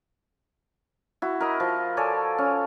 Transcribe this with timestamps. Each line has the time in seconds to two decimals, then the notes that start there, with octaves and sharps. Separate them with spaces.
1.22 E4 F#4
1.41 A#4 D#5 B5
1.60 F3
1.97 A4 C#5 D5 G#5
2.38 C#4